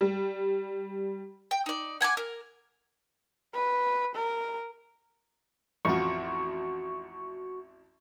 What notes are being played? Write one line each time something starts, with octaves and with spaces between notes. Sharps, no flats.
G3
G5
D#4 D5
F#5 G#5 A5 D6
A#4
B4
A#4
A1 F2 F3 F#4 C#6